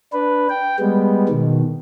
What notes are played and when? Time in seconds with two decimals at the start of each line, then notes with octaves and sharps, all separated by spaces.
0.13 D4 B4
0.49 G5
0.79 G3 G#3 B3
1.29 B2 D#3